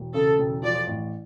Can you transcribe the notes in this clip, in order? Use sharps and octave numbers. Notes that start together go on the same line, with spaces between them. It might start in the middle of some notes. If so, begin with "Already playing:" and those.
Already playing: E1
C#3 A4
E1
F3 D5
A1